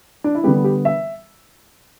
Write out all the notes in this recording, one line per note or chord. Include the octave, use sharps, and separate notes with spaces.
D4
E4
D3 G3 B3 G4
G4
E5